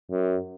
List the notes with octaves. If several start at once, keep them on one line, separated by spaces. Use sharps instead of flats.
F#2